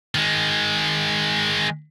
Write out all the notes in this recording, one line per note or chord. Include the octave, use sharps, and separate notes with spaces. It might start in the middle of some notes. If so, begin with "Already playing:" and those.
D#3 G#3